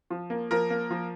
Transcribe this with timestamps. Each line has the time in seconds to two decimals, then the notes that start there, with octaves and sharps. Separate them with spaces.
0.10 F3
0.30 A#3
0.51 F3 A#4
0.70 A#3
0.90 F3